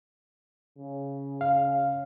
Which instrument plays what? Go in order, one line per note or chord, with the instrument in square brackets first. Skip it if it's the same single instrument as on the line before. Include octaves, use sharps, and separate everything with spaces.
[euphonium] C#3
[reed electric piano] F5